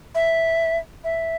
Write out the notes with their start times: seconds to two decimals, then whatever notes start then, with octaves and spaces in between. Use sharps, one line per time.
0.15 E5
1.04 E5